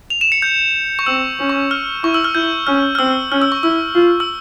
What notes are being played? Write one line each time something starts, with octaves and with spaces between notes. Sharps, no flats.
F7
E7
C#7
G6
C#6
C4 E6
C#4
C#6
F6
E4 C#6
E6
F6
E4 G6
C#4 F6
F6
C4 E6
C#4 F6
E6
C#6
E4 E6
F4
E6